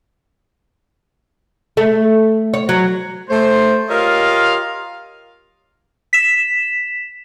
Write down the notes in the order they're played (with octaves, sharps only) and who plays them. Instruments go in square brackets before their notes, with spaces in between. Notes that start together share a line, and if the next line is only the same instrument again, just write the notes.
[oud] A3
C#5
F#3
[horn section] A3 C5
F4 G4 A#4 C#5 D#5 F5
[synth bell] B6 E7